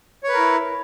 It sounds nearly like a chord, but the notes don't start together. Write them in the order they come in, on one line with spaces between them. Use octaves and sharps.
C#5 B4 A#4 E4